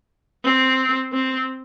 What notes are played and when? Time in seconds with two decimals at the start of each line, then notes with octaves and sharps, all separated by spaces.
0.45 C4
1.13 C4